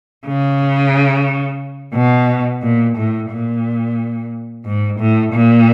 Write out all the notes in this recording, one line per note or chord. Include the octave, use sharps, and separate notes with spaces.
C#3
B2
A#2
A2
A#2
G#2
A2
A#2